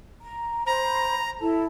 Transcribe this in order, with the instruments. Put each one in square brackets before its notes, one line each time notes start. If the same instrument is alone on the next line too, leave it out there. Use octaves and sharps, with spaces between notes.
[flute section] A#5
[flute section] C5 B5 [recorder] A#5
[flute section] E4 A4 A5